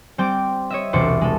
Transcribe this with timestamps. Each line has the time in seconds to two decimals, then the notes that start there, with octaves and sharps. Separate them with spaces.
0.18 G3 C4 G5 D6
0.70 C#5 D#5 E5
0.93 E1 C2 C5 D6 C#7
1.21 G#3 A4